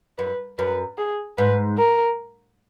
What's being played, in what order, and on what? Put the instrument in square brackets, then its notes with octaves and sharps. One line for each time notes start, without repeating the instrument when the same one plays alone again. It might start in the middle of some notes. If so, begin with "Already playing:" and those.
[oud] F#2 [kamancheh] B4
[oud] F#2 [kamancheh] B4
[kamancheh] G#4
[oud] G#2 [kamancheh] B4
[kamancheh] A#4